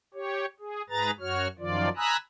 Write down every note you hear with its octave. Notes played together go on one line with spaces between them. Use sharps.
G4 C#5
G#4
G#2 G#4 B4 A#5 A6
F#2 F#4 C#5 F6
F#2 D#3 F3 F4 D5
G#5 A#5 B5 D#6 E6 F#6